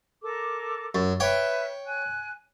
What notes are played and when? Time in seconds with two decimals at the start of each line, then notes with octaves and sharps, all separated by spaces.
0.23 A4 A#4 D6
0.95 F#2 E6
1.20 B4 C#5 E5 G5
1.87 G#5 F#6